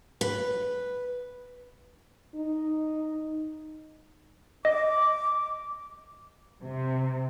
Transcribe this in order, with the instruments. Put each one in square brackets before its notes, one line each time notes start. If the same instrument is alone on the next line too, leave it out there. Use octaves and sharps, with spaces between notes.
[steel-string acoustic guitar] B4
[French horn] D#4
[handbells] D#5 [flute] D6
[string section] C3